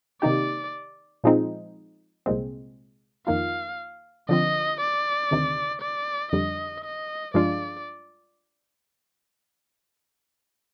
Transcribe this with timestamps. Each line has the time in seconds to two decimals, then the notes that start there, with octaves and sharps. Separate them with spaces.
0.22 C3 D#3 A#3 D#4 G4 D5
1.24 A#2 F3 G#3 C4 D#4
2.26 C2 A#2 G#3 C4
3.27 F2 D#3 A#3 F4 F5
4.29 D3 F3 C4 D#5
4.80 D5
5.31 D2 C3 D#3
5.81 D5
6.32 F2 D3 G3 D#5
6.84 D#5
7.34 G2 F3 G#3 D4 F4 D5